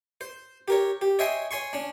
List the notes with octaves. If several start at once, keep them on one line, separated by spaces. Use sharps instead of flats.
C5
G4 A#4 C#5
G4
C#5 D#5 E5 G5 G#5 C6
C#5 G#5 C6 C#6
C#4 D4